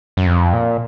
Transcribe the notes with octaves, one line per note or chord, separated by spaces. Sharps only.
F#2
F2
A#2